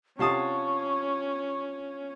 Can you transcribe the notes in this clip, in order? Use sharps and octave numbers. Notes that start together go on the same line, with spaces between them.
C3 C#4 D4 F4 A5 C#6 D#6